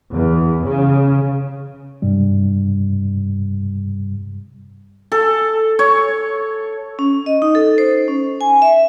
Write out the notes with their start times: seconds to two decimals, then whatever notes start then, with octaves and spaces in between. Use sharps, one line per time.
0.12 E2
0.66 C#3
2.02 G2 C3 G3
5.12 A4
5.79 C#5
6.99 C#4
7.26 D#5
7.42 D#4
7.55 A4
7.78 C5
8.08 C#4
8.41 G#5
8.62 E5